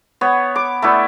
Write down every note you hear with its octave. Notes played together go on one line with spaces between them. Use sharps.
B3 C#5
D6
A3 B3 E4 D5